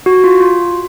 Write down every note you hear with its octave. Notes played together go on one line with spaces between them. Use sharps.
F#4
F4
F4